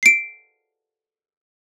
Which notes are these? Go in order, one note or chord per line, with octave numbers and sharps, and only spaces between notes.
C7 D7